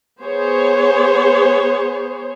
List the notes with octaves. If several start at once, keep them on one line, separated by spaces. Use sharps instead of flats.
B3 G#4 C5 C#5